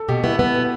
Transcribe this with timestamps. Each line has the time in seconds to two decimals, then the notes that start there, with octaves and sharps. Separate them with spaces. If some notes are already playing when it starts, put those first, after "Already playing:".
Already playing: A4
0.09 B2 G4
0.24 B3 E4
0.39 B3
0.55 B2